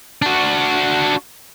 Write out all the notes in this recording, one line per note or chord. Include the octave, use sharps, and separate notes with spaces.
D4 F#4